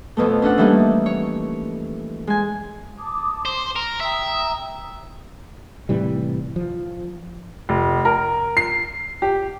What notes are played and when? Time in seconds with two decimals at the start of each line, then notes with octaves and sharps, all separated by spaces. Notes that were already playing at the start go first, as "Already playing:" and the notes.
0.17 F2 B2 A3
0.42 C#4 D4 A4 F#5
0.58 E3 F3 G3 A3 A#3 D#4
1.06 C#5
2.27 G#3 G#5
2.98 A5 D6 D#6
3.45 C5 C6
3.76 A#4
4.01 E5 G5 A#5 D#6
5.89 A2 C3 E3 G3
6.56 F3
7.69 F1
8.05 A#4
8.57 C7
9.22 G4